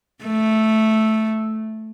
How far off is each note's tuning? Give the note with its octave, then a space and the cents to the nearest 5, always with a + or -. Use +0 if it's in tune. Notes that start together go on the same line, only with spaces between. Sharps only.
A3 -5